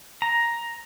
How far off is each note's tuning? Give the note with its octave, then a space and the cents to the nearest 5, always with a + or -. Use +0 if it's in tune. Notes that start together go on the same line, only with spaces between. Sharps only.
A#5 +10